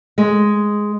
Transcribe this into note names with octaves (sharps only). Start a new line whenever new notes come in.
G#3